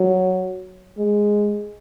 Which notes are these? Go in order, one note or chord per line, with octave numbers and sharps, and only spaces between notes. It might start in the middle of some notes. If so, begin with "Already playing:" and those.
Already playing: F#3
G#3